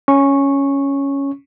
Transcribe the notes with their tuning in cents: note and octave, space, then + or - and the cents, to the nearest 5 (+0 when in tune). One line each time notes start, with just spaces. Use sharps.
C#4 +0 C#6 -10